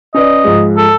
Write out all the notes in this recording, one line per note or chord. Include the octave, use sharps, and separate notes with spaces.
C#4 B4 D5 D#5
G#2 F3 G#3
A4